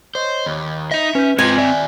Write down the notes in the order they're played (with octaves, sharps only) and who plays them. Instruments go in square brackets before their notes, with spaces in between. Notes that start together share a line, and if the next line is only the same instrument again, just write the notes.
[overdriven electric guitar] C5 [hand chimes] C#5 D#5
[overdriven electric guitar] D#2 [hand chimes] B5
[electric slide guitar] D#4 D#5 [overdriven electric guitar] E5
[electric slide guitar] C#4 [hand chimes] B4 G6
[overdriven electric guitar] G#3 F4 [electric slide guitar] C4 D#5 [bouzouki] G#5
[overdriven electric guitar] D#2 E5 [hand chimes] D5